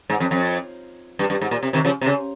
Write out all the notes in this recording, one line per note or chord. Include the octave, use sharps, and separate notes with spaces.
G#2
F2
F2
G2
G2
G#2
A#2
C3
C3 D#3
C#3 F3
C3
C#3